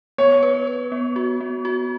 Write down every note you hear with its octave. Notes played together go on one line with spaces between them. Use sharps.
B3 C#5
B4
B4
B3
F#4
B3
F#4